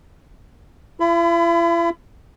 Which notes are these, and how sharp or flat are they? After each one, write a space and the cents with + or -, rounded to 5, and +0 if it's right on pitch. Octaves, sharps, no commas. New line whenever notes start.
E4 +45 B5 +25